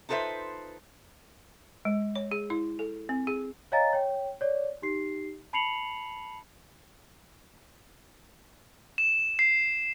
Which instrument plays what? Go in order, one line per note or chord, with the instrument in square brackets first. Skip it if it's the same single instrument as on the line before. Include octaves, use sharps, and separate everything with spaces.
[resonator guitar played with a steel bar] D#4 F4 A4 B4 C5 E5
[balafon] G#3
C#5
G#4
E4
A4
C4
G#4
[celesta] C#5 D#5 F5 G#5 A#5 A6
C#5 G5
C#5 D5
D#4 G4 C7
A5 B5 C7 C#7 F7 F#7
[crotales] E7
C7